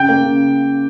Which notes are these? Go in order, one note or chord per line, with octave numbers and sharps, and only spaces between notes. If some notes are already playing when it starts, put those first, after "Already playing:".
Already playing: C#3 G5 G6
A#3
C#3